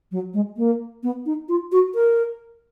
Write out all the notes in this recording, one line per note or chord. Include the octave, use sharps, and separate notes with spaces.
F#3
G#3
A#3
B3
D#4
F4
F#4
A#4